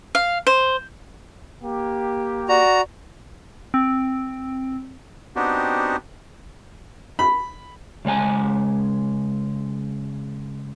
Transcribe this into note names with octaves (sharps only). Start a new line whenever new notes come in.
F5
C5
A#3 G4
F#4 D5 A#5
C4
B3 C4 D4 D#4 F#4 G4
B5
C#3 G#3 C5 G#5 A5